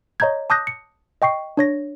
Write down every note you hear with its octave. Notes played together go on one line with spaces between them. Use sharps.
C#5 D#5 A#5 G6 G#6
A5 D6 D#6 F#6 G6 A#6
C#7
D#5 G5 C#6 C7
D4 C#5 A#6